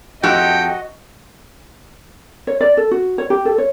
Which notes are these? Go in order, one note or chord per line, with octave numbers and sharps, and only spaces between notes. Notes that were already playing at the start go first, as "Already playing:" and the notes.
F2 F#4 G4 A4 D#5 G5
C#5
D5
A4
F#4
C#5
G4
A4
C#5